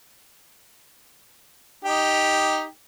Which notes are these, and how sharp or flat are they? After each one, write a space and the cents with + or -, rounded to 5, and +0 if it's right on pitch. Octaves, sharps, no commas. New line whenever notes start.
D#4 +0 G4 +0